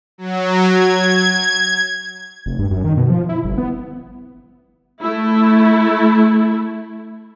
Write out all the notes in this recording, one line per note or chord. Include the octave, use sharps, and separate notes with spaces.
F#3
G#6
F1
G2
F#2
D#3
B2
F3
E4
G1
B3
A3 E4